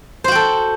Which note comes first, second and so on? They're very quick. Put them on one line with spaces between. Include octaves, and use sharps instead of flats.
C5 F#4 G5 A4